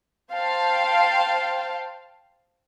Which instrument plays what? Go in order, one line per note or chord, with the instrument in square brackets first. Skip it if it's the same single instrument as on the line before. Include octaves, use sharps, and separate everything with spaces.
[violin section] C5 F5 G5 A5